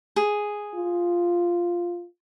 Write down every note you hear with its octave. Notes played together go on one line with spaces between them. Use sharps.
G#4
F4